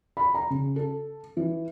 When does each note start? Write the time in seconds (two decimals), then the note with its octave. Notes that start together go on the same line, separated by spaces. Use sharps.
0.17 B5
0.35 A#5
0.50 C#3
0.76 A4
1.37 E3